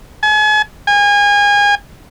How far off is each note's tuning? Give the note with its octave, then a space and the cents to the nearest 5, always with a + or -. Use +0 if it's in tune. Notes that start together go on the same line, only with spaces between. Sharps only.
G#5 +40
G#5 -30